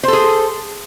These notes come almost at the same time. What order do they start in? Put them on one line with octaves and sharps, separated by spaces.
C5 A4 G#4